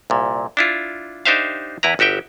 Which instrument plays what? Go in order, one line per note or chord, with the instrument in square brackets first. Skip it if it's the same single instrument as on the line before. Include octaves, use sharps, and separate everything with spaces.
[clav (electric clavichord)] C2 A#2
D4 E4 F4
D4 D#4 G4 C5 E5 F5
E2 E4 B4 A#5
G1 F#4 G4 E5 G5